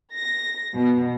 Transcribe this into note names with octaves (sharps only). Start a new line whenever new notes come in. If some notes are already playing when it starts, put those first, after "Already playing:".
A#6
B2